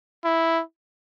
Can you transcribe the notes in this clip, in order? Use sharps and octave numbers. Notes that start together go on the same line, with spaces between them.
E4